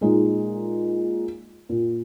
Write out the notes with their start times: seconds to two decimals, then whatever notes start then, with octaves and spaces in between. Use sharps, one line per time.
0.01 A#2 G#3 D#4
1.69 A#2